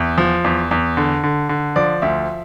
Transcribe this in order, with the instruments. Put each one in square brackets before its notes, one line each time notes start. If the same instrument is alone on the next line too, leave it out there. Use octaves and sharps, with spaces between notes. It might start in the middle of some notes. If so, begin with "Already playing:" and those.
Already playing: [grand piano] E2 E5
F3
E2
E2
D3
D3
D3
F3 D5
D2 E5